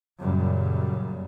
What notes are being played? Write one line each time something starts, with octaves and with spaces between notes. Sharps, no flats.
F#2 A#2 C#3 G3